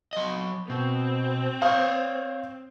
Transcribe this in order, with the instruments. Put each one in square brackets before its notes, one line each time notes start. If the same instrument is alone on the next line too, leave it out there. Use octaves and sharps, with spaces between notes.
[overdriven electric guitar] F#3 D#5
[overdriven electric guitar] B2 [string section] C4
[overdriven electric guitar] C5 C#5 [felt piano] F5 D#6 G6